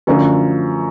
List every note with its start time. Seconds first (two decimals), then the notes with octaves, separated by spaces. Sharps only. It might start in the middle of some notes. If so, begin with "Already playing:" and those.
0.07 F#2 D3 F3 A3